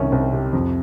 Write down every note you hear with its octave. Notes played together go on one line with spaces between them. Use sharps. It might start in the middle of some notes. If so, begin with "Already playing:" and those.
Already playing: C2 D#3 C#4
C2 C4
C3
F2